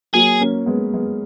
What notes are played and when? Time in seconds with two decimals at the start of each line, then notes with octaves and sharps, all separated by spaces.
0.14 F#3 A#3 G#4
0.40 A#3 C#4
0.66 G#3 B3
0.93 G#3 B3